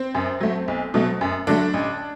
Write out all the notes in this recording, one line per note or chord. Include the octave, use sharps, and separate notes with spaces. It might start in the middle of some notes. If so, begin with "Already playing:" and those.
Already playing: C4
F#2
F#3 A3
B1
B2 F#3 A3
F#2
D3 F#3 A3 D4
A1